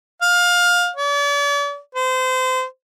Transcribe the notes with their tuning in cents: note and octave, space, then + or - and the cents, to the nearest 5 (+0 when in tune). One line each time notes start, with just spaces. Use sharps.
F5 +20
D5 -45
C5 -30